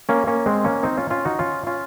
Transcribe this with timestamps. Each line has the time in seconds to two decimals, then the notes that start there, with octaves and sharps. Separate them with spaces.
0.09 A#3 C#4
0.27 A#3 C#4
0.46 G#3 C4
0.64 A#3 C#4
0.83 C4 D#4
0.97 C#4 F4
1.10 C#4 F4
1.25 D#4 F#4
1.39 C#4 F4
1.67 C#4 F4